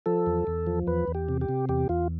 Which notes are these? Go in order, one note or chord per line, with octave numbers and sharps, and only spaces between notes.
F3 A4
E2
E2
F3
E2 B4
E2
G4
C3
G4
C3
E2 G4
E2 F4